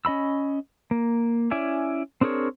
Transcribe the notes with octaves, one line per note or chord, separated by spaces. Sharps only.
C#4 D#5 B5 E6
A#3
C#4 E4 D5 E5 G#5
C4 D4 G#4 A#4 C#5